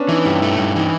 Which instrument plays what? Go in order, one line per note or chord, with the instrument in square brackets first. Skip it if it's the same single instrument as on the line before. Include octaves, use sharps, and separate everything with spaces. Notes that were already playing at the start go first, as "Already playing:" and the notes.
Already playing: [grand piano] B3 C#4 D4
[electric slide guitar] E3 [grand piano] D#4
[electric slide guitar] G2 [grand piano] E4
[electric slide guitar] A3
G2
[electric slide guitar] E3 [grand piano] D#4